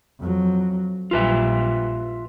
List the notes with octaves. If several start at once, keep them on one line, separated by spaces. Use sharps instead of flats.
F2 F#3
A#1 G3 F4 B4 E5